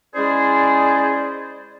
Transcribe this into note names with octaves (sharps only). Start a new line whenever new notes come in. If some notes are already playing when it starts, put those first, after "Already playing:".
G#3 C#4 E4 G#4 C5 D5